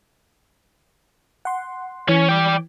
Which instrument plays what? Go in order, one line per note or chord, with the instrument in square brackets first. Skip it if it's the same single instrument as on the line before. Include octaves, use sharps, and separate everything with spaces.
[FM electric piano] F#5 C6
[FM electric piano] E3 [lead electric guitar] C#4 C#5
[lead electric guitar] D5 G5